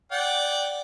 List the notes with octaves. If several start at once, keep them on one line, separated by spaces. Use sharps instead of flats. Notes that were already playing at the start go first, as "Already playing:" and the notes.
D5 F#5 G5